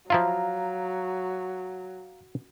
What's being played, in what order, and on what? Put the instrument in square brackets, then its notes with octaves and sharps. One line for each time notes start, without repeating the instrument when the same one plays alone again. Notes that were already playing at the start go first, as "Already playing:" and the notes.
[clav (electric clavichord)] F3 E4 F4 [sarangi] F#3 [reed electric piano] F5 A#5